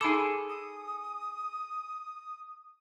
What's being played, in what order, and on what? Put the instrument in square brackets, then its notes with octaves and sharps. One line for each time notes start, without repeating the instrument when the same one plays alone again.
[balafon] D#4 B5 D6 [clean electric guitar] G#4 A4
[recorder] D#6